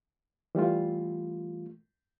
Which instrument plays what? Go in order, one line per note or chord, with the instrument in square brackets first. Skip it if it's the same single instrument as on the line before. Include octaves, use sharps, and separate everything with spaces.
[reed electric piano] E3 G3 A3 F4